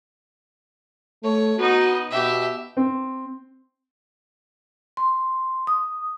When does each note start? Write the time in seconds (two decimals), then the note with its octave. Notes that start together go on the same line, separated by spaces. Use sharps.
1.23 A3 C#5
1.58 B3 D#4 F#4
2.11 B2 G4 E5
2.77 C4
4.97 C6
5.67 D#6